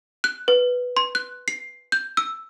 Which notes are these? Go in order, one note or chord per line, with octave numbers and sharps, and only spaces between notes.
F#6
B4
C6
F#6
C7
G6
E6